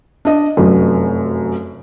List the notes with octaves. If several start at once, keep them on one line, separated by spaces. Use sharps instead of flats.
D4 D#5
F1 F#2